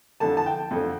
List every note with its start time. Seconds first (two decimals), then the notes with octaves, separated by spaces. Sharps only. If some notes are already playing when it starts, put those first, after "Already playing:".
0.20 F2 D3 A5
0.37 A5
0.46 G5
0.71 F2 D3